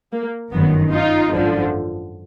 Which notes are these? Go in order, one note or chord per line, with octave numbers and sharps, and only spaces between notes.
A#3
G1 F#2 D#3 B3
D#4 F4
G#1 F#2 D3 F3